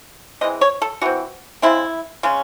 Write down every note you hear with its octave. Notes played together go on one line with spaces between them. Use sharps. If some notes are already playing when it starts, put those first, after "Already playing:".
E3 G#3 C4 D#5
C#5
A4
E3 C4 F#4
C#3 G#3 C4 E4
C#3 G#3 C#4